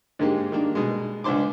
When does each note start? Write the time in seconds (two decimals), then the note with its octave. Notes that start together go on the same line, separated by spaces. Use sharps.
0.19 G#2 D3 G#3 A#3 G4
0.52 D#3 A#3 D4
0.75 B2 G#3
1.24 C#2 D4 C5 C6 D6